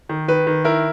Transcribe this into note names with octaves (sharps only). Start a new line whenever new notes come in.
D#3
D#3 B4
D#3
E4 A#4